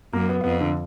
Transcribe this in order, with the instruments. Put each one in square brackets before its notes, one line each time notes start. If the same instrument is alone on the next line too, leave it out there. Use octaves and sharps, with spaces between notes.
[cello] F#2 [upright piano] A#3
[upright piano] B3
[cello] F2 [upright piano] B3
[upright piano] D3